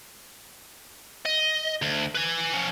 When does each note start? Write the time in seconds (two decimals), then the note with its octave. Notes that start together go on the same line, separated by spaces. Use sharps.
1.25 D#5
1.82 D2
2.15 B4 G#5
2.54 F3 C#4